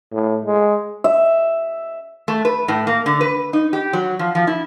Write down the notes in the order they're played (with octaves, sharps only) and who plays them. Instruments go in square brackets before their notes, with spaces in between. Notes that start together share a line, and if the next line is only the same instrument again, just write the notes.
[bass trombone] A2
G#3
[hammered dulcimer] E5
[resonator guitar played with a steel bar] A3
B4
A2
A#3
D3
B4
D#4
G4
F#3
F3
F3
E4